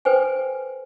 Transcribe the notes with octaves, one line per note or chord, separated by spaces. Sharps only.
A4 B4 C5 G5 G#5